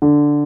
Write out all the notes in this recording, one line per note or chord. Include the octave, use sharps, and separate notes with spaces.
D3